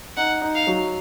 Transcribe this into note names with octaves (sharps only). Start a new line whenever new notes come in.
D#4 F#5
D#4
F5
F#3